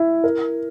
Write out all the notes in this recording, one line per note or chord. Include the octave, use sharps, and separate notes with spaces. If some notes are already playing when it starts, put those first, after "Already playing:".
Already playing: E4
A#4